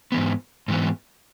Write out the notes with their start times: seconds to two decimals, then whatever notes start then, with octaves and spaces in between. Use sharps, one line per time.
0.12 G#2 E3 B3
0.68 G#2 E3 B3